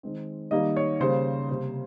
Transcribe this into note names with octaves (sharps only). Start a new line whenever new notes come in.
D#3 G#3 C4
D#3 G3 A#3 D#5
C#5
C#3 G3 A#3 C5
C3 G3 A#3 C5